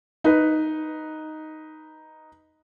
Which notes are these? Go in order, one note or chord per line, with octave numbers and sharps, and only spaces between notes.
D#4 B4